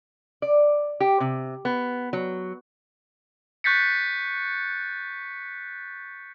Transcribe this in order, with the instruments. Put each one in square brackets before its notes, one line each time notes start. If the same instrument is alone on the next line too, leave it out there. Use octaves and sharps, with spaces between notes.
[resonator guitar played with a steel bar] D5
G4
C3
B3
F#3
[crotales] C#6 F#6 G6 A6 B6 C#7